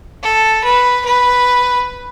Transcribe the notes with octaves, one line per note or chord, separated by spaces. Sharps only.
A4
B4
B4